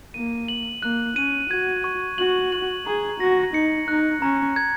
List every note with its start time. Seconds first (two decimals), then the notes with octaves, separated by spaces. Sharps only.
0.14 A#3 D#7
0.48 F#7
0.82 A#3 F#6
1.16 C#4 D#7
1.50 F#4 G#6
1.84 C#6
2.18 F#4 F#7
2.52 F#7
2.86 G#4 A#5
3.20 F#4 A#6
3.54 D#4 C#7
3.88 D#4 F#6
4.22 C#4 A#5
4.56 G#6